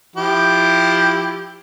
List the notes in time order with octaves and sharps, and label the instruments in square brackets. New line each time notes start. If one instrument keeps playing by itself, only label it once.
[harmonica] F3 E4 G4